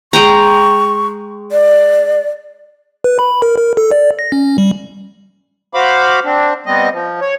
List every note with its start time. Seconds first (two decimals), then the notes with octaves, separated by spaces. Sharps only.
0.13 G#3 G5 A#5 C#6
1.52 D5
3.04 B4
3.19 B5
3.42 A#4
3.57 A#4
3.77 A4
3.91 D5
4.19 A#6
4.32 C#4
4.58 G3
5.74 F#4 C5 F5 B5 D6
6.25 C4 D4
6.66 G3 B3 C4 D#5
6.92 F3
7.21 C#5